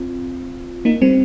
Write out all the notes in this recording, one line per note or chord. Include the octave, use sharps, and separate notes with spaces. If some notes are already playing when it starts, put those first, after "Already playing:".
Already playing: C4 F4
A#3 D#4
G3 C4